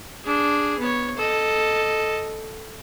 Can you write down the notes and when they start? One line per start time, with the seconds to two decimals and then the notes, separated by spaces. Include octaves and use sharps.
0.24 D4 G#4
0.79 B3 C#5
1.17 A4 D#5